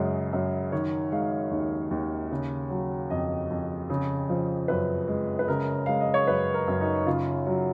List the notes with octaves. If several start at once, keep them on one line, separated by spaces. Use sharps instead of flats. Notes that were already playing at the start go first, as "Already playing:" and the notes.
Already playing: F#2 C#3 G#3
F#2
D#3 C#5
G#3 F5
D#2
D#2
C#3
F#3
F2 D#5
F2
C#3
F3
F#2 B4
G#3
B4
C#3 A#4
G#3 F5
D#5
C#5
F#2 B4
A#4
F#2
D#4
C#3 F4
F#3